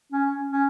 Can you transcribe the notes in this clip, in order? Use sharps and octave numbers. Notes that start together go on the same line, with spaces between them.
C#4
C#4